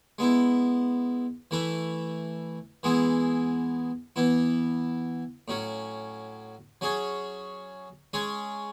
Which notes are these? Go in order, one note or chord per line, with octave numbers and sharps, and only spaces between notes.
G#3 B3 E4
E3 A3 E4 B4
E3 G#3 B3 E4 G#4
E3 B3 E4
A2 F#3 C#4
F#3 C#4 G#4 C#5
G#3 C#4 G#4 C#5